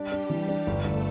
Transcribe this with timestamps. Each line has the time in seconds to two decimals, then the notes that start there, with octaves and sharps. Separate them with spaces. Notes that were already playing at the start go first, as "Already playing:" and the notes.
Already playing: G3 D4 G4
0.12 D4
0.30 E3 G3 G4
0.49 D4
0.67 G1 A3 A4
0.85 G1